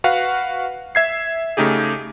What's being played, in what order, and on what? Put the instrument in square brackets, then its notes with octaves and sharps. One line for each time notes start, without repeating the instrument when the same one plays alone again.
[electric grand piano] F#4 B4 F5 F#5
E5 G#6 C7
C#3 A3 D#4 G4 G#4